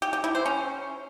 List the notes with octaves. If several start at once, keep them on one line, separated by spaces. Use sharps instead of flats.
G4
G4
E4
C5
C#4